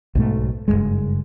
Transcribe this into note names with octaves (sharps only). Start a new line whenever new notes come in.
B1 G#2 A3
F#1 E2 G2 G#3